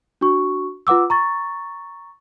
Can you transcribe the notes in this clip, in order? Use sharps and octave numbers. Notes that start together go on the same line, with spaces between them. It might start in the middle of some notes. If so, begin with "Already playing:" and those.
D4 F#4 C#6
F4 B4 F#5 D6 E6
A#5 C#6 A6